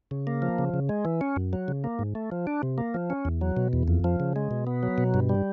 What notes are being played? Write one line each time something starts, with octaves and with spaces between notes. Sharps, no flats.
C#3
A#3
F3
C#3
C#3
G#3
E3
C#4
F#2
F#3
C#3
A#3
G#2
A3
F3
D4
C3
A#3
F3
C#4
E2
F#3
B2
E2
F2
F3
C#3
G#3
B2
B3
F#3
B2
G2
G3